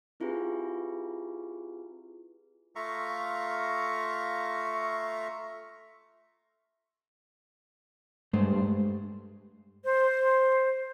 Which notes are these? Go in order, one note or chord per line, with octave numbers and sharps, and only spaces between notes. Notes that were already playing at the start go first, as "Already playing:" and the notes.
C4 E4 F4 G4 G#4 B4
A3 F4 E5 F5 A#5 C#6
G2 G#3 A3 C5
C5